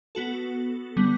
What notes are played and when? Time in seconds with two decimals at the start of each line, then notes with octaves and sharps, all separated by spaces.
0.15 B3 F#4 A4
0.97 D3 G3 B3